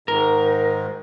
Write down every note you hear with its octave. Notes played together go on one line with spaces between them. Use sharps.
G#2 D#3 A#4